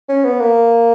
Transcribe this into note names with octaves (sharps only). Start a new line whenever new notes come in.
C#4
B3
A#3